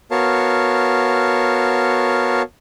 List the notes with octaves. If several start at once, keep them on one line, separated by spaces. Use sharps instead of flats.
B3 F#4 A#4 C#5 F5 A5